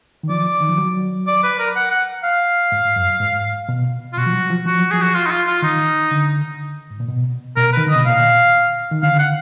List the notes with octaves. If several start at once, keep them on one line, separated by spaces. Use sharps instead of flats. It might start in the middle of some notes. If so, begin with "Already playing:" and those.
D#3
F3 D5
D#3
F3
F#3
D5
B4
A#4
F#5
F#5
F5
G#2
F#2
G#2
B2
F4
B2 F#4
F3
F#3
F3
F3 F#4
F#3
F3 G#4
F#4
F4
D#4
F4
F4
D#3 D#4
D3
G#2
A#2
B2
B2 A#4
D#3 B4
D3 D#5
B2
A#2 F5
D#3
D3 F5
F#5